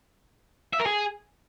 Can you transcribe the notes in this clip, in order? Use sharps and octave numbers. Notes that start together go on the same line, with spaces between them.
E5
A#4
G#4